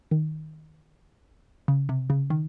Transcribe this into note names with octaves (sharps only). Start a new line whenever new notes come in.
D#3
C#3
C3
C#3
D#3